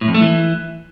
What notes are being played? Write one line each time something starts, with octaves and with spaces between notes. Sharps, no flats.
A2
F2
A3
E3